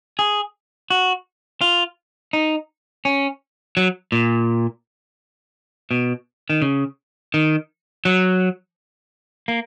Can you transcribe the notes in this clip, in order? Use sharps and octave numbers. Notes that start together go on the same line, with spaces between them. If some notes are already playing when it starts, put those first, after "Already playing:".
G#4
F#4
F4
D#4
C#4
F#3
A#2
B2
D#3
C#3
D#3
F#3
A#3